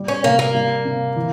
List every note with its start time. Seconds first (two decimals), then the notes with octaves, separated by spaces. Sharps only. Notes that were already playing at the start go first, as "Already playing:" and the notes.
Already playing: G3
0.08 C#4
0.24 C3 A#3
0.39 A#3
0.54 G3
0.85 C3
1.16 E3